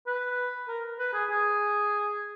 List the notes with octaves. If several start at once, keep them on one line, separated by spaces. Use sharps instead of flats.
B4
A#4
B4
G#4
G#4